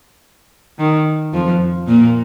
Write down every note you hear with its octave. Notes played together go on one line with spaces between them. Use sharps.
D#3
F2 F3
A#2 A#3